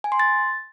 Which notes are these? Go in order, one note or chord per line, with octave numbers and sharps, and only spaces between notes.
G#5
C6
A6